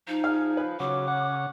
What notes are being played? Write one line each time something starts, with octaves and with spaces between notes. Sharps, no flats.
F3 D#4
G#4 F5
B4 B5
C#3 F#3 D6
F#5